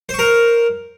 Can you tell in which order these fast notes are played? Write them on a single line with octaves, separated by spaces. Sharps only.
C5 C#6 A#4